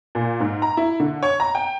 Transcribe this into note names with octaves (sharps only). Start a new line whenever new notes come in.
A#2
G#2
A#5
E4
D3
C#5
A#5
G5